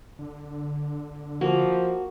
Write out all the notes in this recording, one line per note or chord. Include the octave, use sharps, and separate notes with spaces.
D3
F3 A#3 F#4